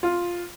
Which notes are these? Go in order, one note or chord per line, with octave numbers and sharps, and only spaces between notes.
F4